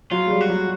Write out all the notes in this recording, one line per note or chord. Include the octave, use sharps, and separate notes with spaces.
F#3 F4
G#3
G3
F#4
F#3